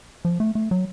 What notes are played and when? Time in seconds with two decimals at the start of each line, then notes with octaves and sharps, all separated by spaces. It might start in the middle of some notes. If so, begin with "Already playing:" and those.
0.25 F3
0.40 A3
0.55 A3
0.71 F#3